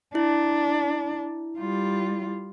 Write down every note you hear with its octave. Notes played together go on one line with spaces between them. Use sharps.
D4 E4
G3 F4